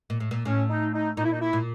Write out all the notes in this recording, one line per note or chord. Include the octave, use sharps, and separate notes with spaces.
A#2
A2
A#2
A2 C#4
D#4
D#4
A#2 D#4
E4
D#4
E4
A#2